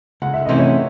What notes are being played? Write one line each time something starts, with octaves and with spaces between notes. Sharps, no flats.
C#2 F#5
E5
C3 E3 A3 C#4 D#5
C#5 E5